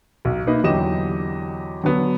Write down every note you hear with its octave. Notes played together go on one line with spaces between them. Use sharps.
B1
A#3 D#4 B4 D#5 E5
E2 D3 F#3 G4 D#5 E7
D3 F#3 B3